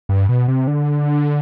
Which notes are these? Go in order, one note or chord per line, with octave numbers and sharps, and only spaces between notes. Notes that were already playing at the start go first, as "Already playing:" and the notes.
G2
B2
C3
D3